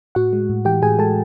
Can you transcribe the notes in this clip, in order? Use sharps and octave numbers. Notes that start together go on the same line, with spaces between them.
A2 F#4 F#5
G#3
A2
E3 G4 G5
A2 G#4 G#5
G#3 A4 A5